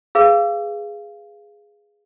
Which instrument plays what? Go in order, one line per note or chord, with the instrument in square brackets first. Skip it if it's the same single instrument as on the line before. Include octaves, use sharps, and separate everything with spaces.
[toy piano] G#4 B4 F5